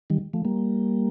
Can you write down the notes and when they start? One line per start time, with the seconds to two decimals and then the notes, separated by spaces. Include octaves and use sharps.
0.10 D#3 G3
0.33 F3 A3
0.45 G3 A#3